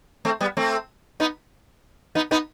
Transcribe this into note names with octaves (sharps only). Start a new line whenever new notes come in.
A3 C4
G3 B3
A3 C4
B3 D#4
B3 D#4
B3 D#4